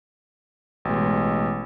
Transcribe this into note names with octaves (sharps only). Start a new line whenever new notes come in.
A1 B2 G#3